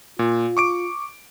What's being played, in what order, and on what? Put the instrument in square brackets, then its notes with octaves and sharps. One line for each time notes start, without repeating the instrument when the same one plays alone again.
[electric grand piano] A#2 [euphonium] F4
[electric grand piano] C#6 D6 D7